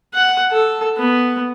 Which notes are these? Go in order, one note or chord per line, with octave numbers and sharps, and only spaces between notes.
F#5
A4
B3